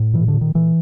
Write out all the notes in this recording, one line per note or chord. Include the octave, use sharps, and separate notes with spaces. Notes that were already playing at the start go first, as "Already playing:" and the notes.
Already playing: A2
A#2 E3
D3
A#2
D#3
A#2 E3